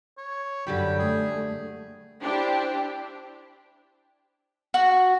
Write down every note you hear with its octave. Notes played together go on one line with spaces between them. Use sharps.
C#5
F#2 D3 G3 G5 B5
A3 G#4
D4 E4 G4 C5
F#4